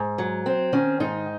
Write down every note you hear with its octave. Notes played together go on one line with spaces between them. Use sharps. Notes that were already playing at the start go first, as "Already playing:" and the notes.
Already playing: G#2
F#3
C4
D#3 C#4
G#2 D#4